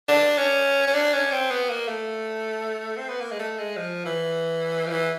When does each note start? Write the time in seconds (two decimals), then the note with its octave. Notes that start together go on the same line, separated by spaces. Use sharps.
0.08 D4
0.37 C#4
0.87 C#4
0.94 D4
1.13 C#4
1.32 C4
1.51 B3
1.69 A#3
1.88 A3
2.97 C4
3.09 B3
3.21 A#3
3.32 G#3
3.39 A3
3.58 G#3
3.77 F3
4.05 E3
4.87 F3
4.90 E3